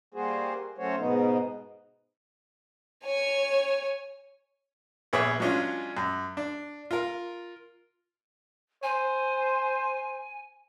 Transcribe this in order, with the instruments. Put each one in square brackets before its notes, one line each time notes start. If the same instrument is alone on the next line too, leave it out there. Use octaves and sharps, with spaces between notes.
[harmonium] G3 A#3 F#4 G#4 C5
F#3 A3 C#4 F#4 C5 C#5
G#2 B2 B3 D#4
[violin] C#5 G#5
[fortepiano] A#1 B3 G#4 C#5 E5 D6
F#3 G#3 C#4 D4 F4
F#2
D4
F4 A#4
[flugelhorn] C5 [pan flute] G#5